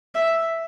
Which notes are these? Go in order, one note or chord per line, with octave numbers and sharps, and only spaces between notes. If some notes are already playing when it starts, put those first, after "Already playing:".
E5